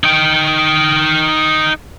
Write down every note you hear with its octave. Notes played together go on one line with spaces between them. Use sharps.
D#4 G5